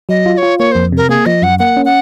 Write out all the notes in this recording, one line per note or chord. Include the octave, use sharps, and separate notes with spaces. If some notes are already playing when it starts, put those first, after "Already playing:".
F#3 D#5
F4
D#5
C#5
F4
A#3 C#5
F2 C5
C3 A#4
A#3 G#4
F3 D#5
F#2 F#5
A#3 F#5
C#4
F#5